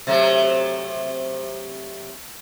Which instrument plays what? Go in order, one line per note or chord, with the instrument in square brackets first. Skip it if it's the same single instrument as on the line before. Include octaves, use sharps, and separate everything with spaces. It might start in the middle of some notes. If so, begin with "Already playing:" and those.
[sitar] C3 F#3 A3